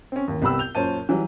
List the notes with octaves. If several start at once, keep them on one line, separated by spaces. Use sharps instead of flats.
C4 C#4
A1 D#2
C2 B3 G4 B5 E6
G6 F7
F#2 A#2 C5 C#5 A5 D#7
E3 F#3 G3